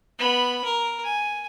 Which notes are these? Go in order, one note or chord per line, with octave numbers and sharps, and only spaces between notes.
B3 B5
A#4
G#5